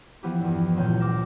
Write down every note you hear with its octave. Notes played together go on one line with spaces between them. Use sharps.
E3 F3 B3 E4 G4
E2 G2
C#2 A#2 E3 F#3 G6
D#2 D6 F6 A#6 E7